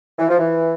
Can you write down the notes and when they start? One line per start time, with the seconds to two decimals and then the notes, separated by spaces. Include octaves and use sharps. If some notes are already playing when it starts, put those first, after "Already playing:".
0.19 E3
0.28 F3
0.39 E3